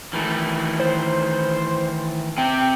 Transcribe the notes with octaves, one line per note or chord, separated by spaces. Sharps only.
D#3 E3 A3
C5
C3 C4 G5